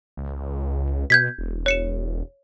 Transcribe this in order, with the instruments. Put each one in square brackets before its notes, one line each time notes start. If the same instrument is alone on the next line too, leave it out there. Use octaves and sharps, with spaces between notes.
[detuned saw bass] C#2
[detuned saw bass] B2 [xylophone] G6 G#6 B6
[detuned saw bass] E1
[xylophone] C#5 C#7 E7